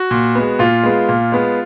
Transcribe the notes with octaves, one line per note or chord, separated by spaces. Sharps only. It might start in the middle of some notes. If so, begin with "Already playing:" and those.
Already playing: F#4
A#2
G#3 B3
A#2 F4
G#3 B3
A#2
G#3 B3